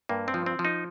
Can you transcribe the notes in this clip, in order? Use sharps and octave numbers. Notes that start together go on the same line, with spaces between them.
G2 A#3
C4
F3
C4
F3
D#4